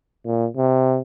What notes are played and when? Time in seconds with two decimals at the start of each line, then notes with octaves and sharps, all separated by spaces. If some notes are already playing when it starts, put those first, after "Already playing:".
0.25 A#2
0.56 C3